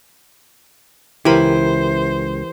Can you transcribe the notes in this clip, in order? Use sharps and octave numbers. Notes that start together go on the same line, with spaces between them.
C#2 E3 E4 G4 A#4 C5 B5